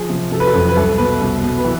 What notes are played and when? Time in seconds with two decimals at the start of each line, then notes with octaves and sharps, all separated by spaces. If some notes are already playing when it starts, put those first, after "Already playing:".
Already playing: F3 G#4
0.10 C3
0.31 C3 A4
0.40 B4
0.47 A4
0.54 F2
0.68 B4
0.76 C2 A4
0.98 B2 B4
1.21 C2
1.43 B2
1.58 B4
1.65 E3